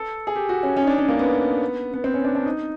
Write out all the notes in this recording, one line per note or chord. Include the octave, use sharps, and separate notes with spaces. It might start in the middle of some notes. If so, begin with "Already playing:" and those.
Already playing: A4
G#4
G4
F#4
C#4
C#4
D#4
D4
C#4
A#3
B3
B3
C4
C#4
D4
D4
D#4